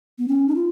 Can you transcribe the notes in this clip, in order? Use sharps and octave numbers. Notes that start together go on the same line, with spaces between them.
B3
C#4
D#4
F4